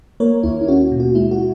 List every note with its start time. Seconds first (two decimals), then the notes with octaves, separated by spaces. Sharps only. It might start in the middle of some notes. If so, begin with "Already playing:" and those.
0.20 A#3 A#4 C#5
0.43 D#2 E4
0.61 E4
0.68 C#4 F#4
0.92 B2
1.00 F#4
1.15 G#3 E4
1.31 F#4